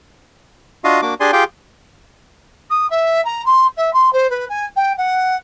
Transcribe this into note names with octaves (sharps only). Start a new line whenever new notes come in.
D4 F4 F#4 D#5 F5
A#3 D4 F#4 D6
D4 G4 G#4 D5 G#5 C6
F4 G4 G#4 F5 G5
D#6
E5
A#5
C6
E5
C6
C5
B4
G#5
G5
F#5